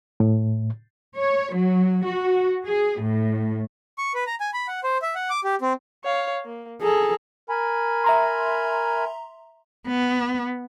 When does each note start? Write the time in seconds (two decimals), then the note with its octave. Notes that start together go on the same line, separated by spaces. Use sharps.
0.20 A2
1.16 C#5
1.52 F#3
2.05 F#4
2.65 G#4
3.01 A2
3.98 C#6
4.14 B4
4.27 A#5
4.40 G#5
4.54 B5
4.68 F#5
4.84 C5
5.02 E5
5.15 F#5
5.30 D6
5.44 G4
5.61 C4
6.04 C#5 F5
6.45 A#3
6.82 G#4 A4 A#5
7.49 A#4 G#5 B5
8.04 E5 A#5 C6
9.88 B3